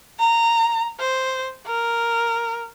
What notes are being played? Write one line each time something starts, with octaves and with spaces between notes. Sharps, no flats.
A#5
C5
A#4